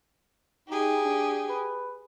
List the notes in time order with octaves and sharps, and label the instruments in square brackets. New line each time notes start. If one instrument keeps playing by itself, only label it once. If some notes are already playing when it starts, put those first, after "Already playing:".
[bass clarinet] D#4 [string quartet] G4 G#4
[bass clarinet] D4
B4